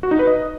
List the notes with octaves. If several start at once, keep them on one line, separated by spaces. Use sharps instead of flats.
F#4
D#4
B4
D#5